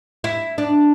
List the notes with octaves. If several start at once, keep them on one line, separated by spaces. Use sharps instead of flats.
E4
D4